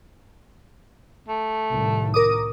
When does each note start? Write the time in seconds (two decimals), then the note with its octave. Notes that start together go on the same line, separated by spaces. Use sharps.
1.29 A3
1.72 C2 A2 D#3
2.14 A#4 D6 D#6